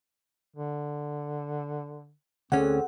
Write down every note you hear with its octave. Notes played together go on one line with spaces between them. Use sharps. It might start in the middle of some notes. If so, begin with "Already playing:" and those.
D3
D2 C4 C#4 G#4 A4 F#5